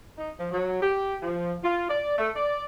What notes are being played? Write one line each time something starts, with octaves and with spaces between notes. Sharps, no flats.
D#4
F3
F#3
G4
F3
F4
D5
A3
D5